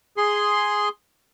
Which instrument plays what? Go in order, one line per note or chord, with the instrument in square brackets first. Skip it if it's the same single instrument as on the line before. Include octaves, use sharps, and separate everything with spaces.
[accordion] G#4 C6